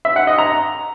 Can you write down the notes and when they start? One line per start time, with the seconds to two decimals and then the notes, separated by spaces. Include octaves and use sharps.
0.05 E5
0.16 F#5
0.27 D#5
0.38 A#5